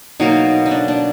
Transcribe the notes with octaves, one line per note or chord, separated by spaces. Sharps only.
B2 F#3 A#3 D#4
D#4
D4
D4